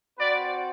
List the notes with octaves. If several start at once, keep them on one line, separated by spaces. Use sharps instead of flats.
C4 F#4 B4 D5